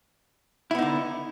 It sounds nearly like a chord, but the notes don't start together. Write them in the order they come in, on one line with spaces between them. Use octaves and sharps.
E4 B3 D#4 D3